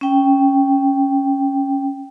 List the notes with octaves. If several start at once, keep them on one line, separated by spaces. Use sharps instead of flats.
C#4 G5